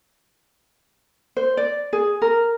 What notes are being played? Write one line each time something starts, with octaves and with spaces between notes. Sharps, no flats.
C5
D5
G#4
A#4